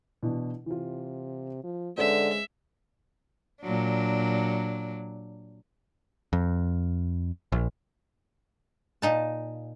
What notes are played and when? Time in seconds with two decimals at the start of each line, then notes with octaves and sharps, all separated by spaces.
0.23 B2 E3 D4
0.66 C3 E3 F4
1.63 F3
1.98 D3 G#3 C#4 B4 C5 E5
3.62 A#2 F#3 D4
6.33 F2
7.52 A#1
9.02 A#2 D#4 A5